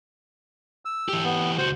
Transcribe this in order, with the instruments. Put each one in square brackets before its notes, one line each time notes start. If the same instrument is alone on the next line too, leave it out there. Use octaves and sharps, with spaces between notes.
[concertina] E6
[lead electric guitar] E3 G4
[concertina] B3
[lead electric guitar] C#2 F#4 [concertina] C5